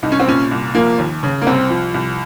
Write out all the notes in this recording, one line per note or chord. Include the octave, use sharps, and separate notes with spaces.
C2 D#4
C#4
C4
A#2 C#4
C2
F3 A#3
D#2
C#3
A#3
C2 C4
F3
C2